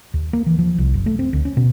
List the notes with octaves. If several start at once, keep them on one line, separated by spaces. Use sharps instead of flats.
D#2
A#3
E3
F3
C2
F#1
A3
C4
D2
C#4
B2